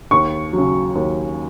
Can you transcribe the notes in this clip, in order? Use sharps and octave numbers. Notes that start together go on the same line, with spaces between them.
D#2 C#6
C#3 F#3
D#2